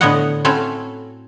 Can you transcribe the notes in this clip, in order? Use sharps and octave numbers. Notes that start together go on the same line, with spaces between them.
A2 D3 B3 C#5 D#5 F#5
C4 C#4 E4 F#4 A4 C#5